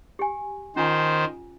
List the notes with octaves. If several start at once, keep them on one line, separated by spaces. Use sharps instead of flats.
G4 G#5
D#3 C#4 F4 C5 G#5